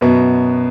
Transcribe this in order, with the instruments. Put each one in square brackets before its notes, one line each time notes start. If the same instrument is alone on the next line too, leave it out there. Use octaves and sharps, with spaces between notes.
[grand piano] F#2 B2 B3